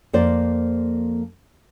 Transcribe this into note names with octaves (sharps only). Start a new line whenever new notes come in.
F2 A#3 C5 D5